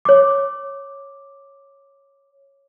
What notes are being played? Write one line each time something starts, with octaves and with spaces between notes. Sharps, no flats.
C#5 D6